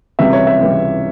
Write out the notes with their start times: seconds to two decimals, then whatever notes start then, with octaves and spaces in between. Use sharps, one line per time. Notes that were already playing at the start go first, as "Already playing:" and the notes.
0.19 C#2 C3 E3 G3 E5
0.33 C#5
0.47 E5
0.61 C#2 C3 E3 G3